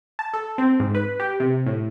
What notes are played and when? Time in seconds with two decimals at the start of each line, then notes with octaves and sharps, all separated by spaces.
0.19 A5
0.34 A4
0.58 C4
0.80 G#2
0.95 B4
1.20 G4
1.40 C3
1.66 A2